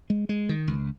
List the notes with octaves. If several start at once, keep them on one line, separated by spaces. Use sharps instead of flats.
G#3
G#3
D#3
C#2